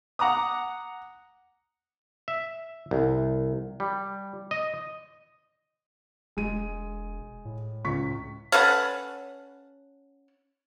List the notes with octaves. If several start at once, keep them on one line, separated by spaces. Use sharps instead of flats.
F#5 A#5 D6 D#6
E5
C2
G3
D#5
E1 G#3 D#7
A2
C#2 C#6 B6
C#4 A4 B4 F#5